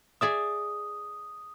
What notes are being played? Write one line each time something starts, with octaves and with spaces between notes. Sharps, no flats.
G#4 D5 E5 D#6